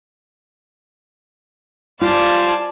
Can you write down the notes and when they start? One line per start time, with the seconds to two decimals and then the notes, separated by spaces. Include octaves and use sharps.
2.01 G3 F4 C5 D5 F5 G#5 A5